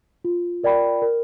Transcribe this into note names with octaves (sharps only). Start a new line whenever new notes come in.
F4
A#4 D5 G5 B5
A#4